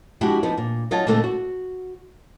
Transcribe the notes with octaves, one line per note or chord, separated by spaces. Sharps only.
F3 G#3 D4 E4 F#4 G4
F3 B3 D#4
A#2
F#3 D#4 F4 G#5 A5
A#2 D3 G#3 A3 C4 A4
F#4